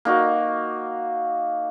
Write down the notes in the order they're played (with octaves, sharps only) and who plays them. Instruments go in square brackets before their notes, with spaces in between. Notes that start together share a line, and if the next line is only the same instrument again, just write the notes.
[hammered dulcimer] A#3 D#4 F#4